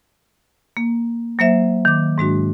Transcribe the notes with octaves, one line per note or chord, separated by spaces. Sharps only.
A#3
F#3 A#3 C5 E5
D#3 D6
G#2 G#3 D4 F#4